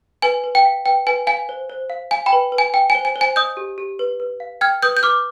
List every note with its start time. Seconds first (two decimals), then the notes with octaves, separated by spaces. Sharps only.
0.22 B4 G#5
0.44 B4
0.55 G5
0.65 F5
0.86 B4 G5
1.07 B4 G#5
1.27 F5 G#5
1.49 C5
1.70 C5
1.90 F5
2.11 F5 G#5
2.26 G5 B5
2.32 B4
2.52 B4
2.58 G#5
2.74 G5
2.90 G#5
2.95 C5
3.05 G#5
3.16 C5
3.21 G#5
3.36 D#5 D#6 G6
3.57 G4
3.78 G4
3.99 B4
4.20 B4
4.40 F5
4.61 G5 F6 G#6
4.83 B4 D#6 G6
4.97 G6
5.03 B4 D6 F6